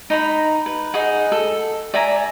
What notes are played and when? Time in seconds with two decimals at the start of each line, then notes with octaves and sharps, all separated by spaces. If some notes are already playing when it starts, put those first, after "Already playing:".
0.10 D#4 A#5 B5
0.66 B4
0.94 D#4 G#4 F#5
1.32 A4
1.94 D5 E5 G#5 A#5